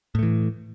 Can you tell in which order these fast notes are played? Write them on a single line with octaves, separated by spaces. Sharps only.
A2 A3 E3